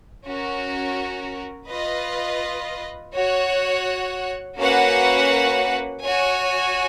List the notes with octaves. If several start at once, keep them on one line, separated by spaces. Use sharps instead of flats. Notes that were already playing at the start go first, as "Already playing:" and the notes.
C#4 F#4 A#4
F4 B4 D#5
F#4 C#5 F#5
A#3 C#4 F#4 B4 F#5
F#4 C#5 G#5